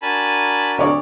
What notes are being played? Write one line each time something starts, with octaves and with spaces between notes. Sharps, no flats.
D4 F#4 A#4 G#5 A5 B5
D2 C#5 D5